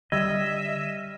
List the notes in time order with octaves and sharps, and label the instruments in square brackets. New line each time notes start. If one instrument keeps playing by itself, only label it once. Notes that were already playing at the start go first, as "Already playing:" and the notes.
[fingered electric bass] D3 [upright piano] G3 E6 G#6 [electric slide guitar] D#5 [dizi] E5